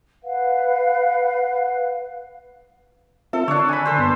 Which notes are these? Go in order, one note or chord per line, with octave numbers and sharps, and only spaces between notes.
B4 F5 F#5
C4 F4 A4 E5
D3 D4 C#5
G#5 B5
A4 C5
G2 B3